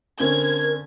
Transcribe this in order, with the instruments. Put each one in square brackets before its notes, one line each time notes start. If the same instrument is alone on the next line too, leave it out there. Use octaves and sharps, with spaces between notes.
[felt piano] D3 C4 C#4 [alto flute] A#4 [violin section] G#6